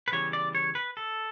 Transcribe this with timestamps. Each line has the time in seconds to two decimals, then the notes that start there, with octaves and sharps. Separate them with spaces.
0.08 B4
0.12 C#3 E3 G3 B3 C#5
0.33 D5
0.55 C#5
0.75 B4
0.97 A4